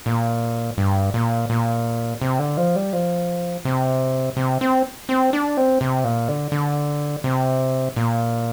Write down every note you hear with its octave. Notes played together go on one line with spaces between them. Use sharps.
A#2
G2
A#2
A#2
C3
D3
F3
G3
F3
C3
C3
C4
C4
D4
C4
C3
A#2
D3
D3
C3
A#2